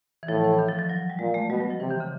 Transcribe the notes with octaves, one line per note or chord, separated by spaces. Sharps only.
E3
A2 F3
E3
D#3
F3
F3
F#3
G3
A#2 G#3
A3
B2 G3
F#3
F3
C3 E3
D#3
C#3